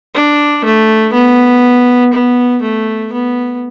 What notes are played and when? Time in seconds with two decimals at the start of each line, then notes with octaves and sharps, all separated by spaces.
0.14 D4
0.64 A3
1.13 B3
2.13 B3
2.62 A3
3.12 B3